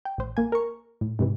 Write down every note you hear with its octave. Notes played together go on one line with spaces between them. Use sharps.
G5
A1 C5
A#3 G#5
A#4 C#6
A2
G#2 C3 E3